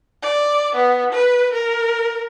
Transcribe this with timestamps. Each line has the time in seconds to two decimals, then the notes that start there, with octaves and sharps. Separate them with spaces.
0.23 D5
0.75 B3
1.12 B4
1.53 A#4